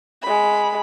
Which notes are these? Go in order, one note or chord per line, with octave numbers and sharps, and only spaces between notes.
G#3 B5